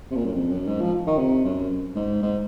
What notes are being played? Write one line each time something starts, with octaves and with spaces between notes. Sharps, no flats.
C3
A#2
F#2
F2
F#2
G#2
F3
D#3
C3
F#2
G#2
G#2